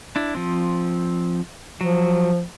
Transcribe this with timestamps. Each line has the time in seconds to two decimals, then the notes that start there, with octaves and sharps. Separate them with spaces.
0.16 D4 E4
0.35 F3 C4
1.81 F3 F#3